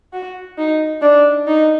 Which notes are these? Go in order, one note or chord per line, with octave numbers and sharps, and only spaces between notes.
F#4
D#4
D4
D#4